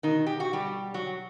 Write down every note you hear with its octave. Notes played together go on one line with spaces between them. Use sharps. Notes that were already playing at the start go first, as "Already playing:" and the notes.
B2 D#3 D#4
G4
F#4
G3 G4
F#3 F#4